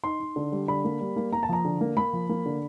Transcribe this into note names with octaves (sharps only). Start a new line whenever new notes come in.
D#4 C6
D#4
D3
G3
D3 B5
A#3
G3
A#3
A#3 A#5
A5
F3 A#5
D3
A#3
A#3 B5
F3
A#3
D3